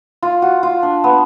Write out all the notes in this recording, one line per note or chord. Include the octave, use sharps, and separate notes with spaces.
F4
F#4
F4
D4
B3